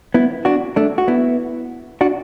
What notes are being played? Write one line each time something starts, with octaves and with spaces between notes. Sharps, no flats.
B3 E4
D4 F#4
A3 D4
F#4
B3 E4
D4 F#4